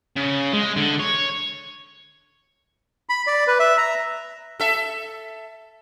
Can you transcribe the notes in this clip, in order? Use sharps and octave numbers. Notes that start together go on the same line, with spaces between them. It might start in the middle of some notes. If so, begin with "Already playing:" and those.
C#3
G#3
D3
C#5
B5
D5
B4
E5
A#5
A4 E5